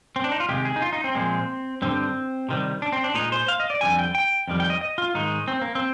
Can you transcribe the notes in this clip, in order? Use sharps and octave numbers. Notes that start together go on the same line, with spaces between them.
C4
D4
D#4
F4
C3 D#3 G#3 G4
G#4
D#4
F4
D#4
C4
A#2 F3 G#3
G2 D3 G3 C4
C3 D#3 G3
D4
C4
D4
A#2 G#3 D#4
C5
F5
D#5
D5
F2 D3 G3 G#5
G5
G5
F2 D#3 G3
G5
D#5
D#5
F4
G#2 D#3 G#3 D#4
C4
A#3
C4